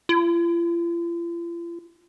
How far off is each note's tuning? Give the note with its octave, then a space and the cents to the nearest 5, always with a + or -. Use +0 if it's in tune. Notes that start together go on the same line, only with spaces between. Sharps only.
F4 -45